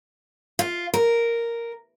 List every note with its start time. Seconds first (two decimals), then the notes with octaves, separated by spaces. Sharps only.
0.59 F4
0.94 A#4